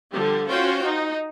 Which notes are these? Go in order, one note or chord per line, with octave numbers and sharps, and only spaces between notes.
D3 F3 G3 G4
C#4 F4 F#4 C5 G5
D#4